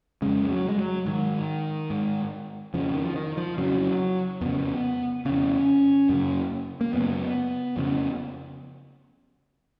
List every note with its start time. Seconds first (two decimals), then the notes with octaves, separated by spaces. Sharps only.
0.22 F2 C#3 G#3
0.50 F#3
0.69 G#3
0.79 F#3
1.06 G#2 D#3
1.90 G#2
2.74 F2 C#3 F3
2.94 D#3
3.05 F3
3.15 D#3
3.37 F3
3.58 F2 C#3 F#3
4.41 F2 C#3 B3
5.25 F2 C#3 C#4
6.09 F#2 C#3
6.81 A#3
6.93 F#2 C#3 B3
7.77 F2 C#3